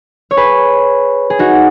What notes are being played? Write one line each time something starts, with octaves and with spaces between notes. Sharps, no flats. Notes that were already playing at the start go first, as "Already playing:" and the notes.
C#5
G#4 B4
G#4
D#4 F#4